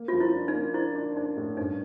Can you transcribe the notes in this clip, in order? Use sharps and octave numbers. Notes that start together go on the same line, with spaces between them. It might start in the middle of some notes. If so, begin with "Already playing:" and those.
Already playing: A#3
F3 F4
E4
D4
D#4
A#3
D4 E4
D4
D4 D#4
A2
G2 D#4